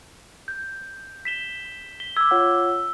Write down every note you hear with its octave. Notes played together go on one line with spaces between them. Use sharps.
G6
B6 E7 G7
B6 G7
D6 E6 G#6
F4 C#5 F#5